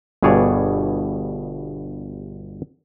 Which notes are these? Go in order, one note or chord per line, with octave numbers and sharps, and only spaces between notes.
G1 G2 B2 G#4 C#5 D5